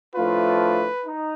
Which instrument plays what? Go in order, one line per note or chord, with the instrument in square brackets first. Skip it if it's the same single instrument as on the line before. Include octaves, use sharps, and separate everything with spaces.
[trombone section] A2 F3 A3 D4 F4 [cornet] B4
[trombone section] D#4